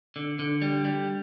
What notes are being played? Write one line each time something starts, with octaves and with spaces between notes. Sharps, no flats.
D3
D3
G3
G3